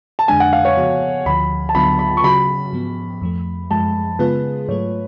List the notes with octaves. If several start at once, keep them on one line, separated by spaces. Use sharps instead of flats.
A5
F2 D3 G#3 D4 G#5
F#5
F5
C#5
C#3 F3 B3 F#4
D2 D3 F3 B5
A5
D2 D3 F#3 B3 F4 B5
B5
C#6
C#3 F#3 C#4 F#4 B5
G#2 F3 B3
F2 F3 A3
F#2 F3 G#3 A5
C#3 G#3 B3 F4 G#4 B4
G#2 F#3 A3 F4 C#5